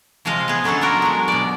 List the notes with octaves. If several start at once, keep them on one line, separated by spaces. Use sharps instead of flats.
C3 F3 G#3 D#5 F5
B3 G#4
D3 F#3 B3 C#4 A4
B3 D4 F4 F#4 A#4
F#3 G#3
B2 D5